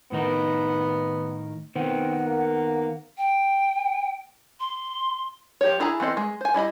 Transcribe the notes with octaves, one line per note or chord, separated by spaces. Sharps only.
A2 D#3 B3 D#4
D#3 B3 C4 F#5
A#3
G5
C6
F3 G4 C#5
D4 E4 G#4 G#5 A#5
E3 B3 C4 A4 D#5
G#3
C5 G#5
G3 E4 D#5 B5